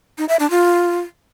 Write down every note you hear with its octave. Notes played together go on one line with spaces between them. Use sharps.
D#4
E5
D4
F4